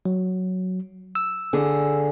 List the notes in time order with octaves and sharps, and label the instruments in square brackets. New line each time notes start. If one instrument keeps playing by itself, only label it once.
[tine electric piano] F#3
E6
[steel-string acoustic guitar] D3 G#4